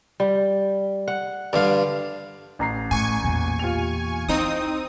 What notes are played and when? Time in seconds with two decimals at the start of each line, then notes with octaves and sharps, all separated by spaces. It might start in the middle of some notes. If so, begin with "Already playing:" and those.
0.20 G3
1.08 F#5
1.53 G2 D3 D5 F5
2.59 A1 A#5 C7
2.91 A2 G#5 C#6
3.24 E2 A#2
3.59 F4 G4 F7
4.29 C4 D#4 E4 D#6